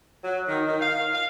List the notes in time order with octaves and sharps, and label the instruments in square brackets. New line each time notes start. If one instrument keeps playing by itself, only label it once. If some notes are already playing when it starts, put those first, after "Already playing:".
[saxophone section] F#3
D#3
D#3
F5
F5